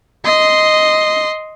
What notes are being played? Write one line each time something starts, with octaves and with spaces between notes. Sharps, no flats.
D#5 C6